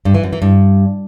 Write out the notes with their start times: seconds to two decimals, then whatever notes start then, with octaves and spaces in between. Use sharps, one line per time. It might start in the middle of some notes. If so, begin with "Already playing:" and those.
0.05 G2
0.14 E3
0.23 F#2
0.33 E3
0.42 G2